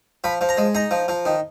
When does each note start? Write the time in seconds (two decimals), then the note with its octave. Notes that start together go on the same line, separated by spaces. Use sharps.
0.24 F3 B5
0.41 F3
0.49 A#5
0.57 G#3
0.75 D#4 A#5
0.91 F3
1.08 F3
1.25 D#3